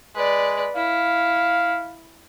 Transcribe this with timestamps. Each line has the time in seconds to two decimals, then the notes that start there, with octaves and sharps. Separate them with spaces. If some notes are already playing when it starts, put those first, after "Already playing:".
0.15 G#3 B4 D5
0.76 E4 F5